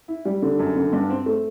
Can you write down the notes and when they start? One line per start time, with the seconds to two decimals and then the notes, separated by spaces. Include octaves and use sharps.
0.08 E4
0.25 G3
0.42 D3
0.59 F#2
0.76 D3
0.93 G2
1.10 C4
1.26 A3